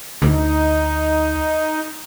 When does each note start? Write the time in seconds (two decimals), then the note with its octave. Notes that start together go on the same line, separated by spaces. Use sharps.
0.22 D2 D#4